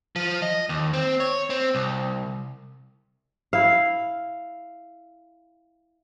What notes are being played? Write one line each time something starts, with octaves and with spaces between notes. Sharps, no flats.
F3
D#5
D#2
C4
C#5
C4
C2
E4 F5